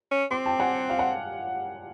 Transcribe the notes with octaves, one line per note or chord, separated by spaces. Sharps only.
C#4
C4 C6 D6
G5 A5
F#5 G#5
F5
F#5